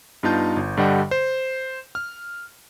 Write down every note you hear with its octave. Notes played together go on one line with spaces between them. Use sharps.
G2 B3 D#4 F4 A5 G6
G1
G2 D3 G3 D#5 F#5 G5
C5
F6